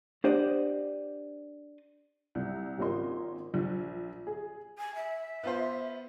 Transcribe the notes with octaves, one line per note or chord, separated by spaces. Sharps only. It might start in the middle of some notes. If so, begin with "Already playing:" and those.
D4 G4 C5 D5 D#5 F#5
C2
G#1 A#2 C#4 A#4 D#5 C6
A#1
G#4
G#5
E5
B3 F4 C5